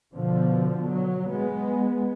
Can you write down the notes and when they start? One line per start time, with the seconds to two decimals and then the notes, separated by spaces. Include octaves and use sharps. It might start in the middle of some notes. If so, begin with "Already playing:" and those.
0.13 B2 D3 F3
0.89 F#3
1.31 G#3 B3